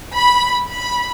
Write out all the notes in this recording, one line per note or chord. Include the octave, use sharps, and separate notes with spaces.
B5
B5